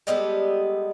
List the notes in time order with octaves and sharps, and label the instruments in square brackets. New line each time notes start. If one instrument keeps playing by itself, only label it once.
[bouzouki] G3 G#3 B3 A4